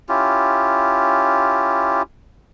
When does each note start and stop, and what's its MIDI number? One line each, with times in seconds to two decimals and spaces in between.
0.09 2.02 61
0.09 2.02 64
0.09 2.02 65
0.09 2.02 67